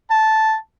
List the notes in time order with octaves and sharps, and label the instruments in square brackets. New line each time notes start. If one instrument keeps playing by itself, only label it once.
[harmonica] A5